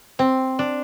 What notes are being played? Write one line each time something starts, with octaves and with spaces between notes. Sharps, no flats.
C4
D4